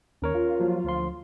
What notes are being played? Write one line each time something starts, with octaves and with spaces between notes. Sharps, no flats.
D#2 C#4 A#4 C#5
F4
F3 F#3 A#3
D2 F3 C6